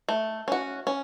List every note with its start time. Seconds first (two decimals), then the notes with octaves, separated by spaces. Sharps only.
0.09 A3
0.48 C#4 F#4
0.87 C#4